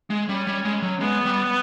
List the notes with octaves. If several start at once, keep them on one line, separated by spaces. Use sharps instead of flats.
G#3
G3 C#4
G3
G#3
F#3
G#3 B3
G3